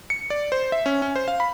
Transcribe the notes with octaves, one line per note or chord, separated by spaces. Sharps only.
C#7
D5
C5
E5
C#4
C#4
C5
F5
B5